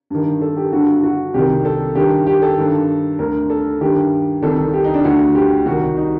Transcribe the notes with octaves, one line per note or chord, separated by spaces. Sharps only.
G2 D#3
A4
G4
G2 D3 F#4
F#4
C2 C3 D#3 G4
A4
G2 D#3 G4
G4
A4
G2 D#3
D2 D3 A#4
A4
G2 D#3 G4
C2 C3 D#3 A4
G4
D#4
D4
D2 D3 F#4
G4
C2 C3 D#3 F#4
D#4